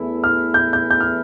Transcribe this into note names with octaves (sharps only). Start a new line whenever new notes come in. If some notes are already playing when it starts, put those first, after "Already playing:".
Already playing: E2 E3 A3 E4
F6
G6
G6
G6
F6